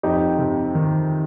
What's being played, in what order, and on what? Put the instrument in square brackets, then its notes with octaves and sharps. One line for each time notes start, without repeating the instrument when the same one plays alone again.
[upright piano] F2 [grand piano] D#4 G4
[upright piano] C3
D#3